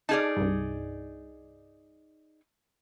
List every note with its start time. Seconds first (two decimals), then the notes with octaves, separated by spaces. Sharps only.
0.09 D#4 G#4 D5 A5 F6
0.36 C2 G2